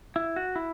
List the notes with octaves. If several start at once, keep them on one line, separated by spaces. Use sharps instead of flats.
E4
F#4
E4